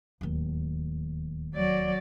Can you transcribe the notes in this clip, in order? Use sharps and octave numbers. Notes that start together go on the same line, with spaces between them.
D1 D#2
F#3 D5